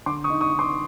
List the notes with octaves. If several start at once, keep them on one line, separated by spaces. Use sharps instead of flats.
D3 C6 D6
C#6 D#6
D#4
C#6 D#6
D#4
C6 D6